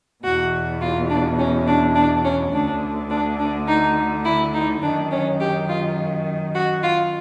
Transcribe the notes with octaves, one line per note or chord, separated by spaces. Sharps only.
E2 B2 F#4
F4
D4
C#4
D4
D4
C#4
D2 D3 D4
D4
D4
D#4
E4
D#4
F#2 D#3 D4
C#4
G4
F4
F#4
F4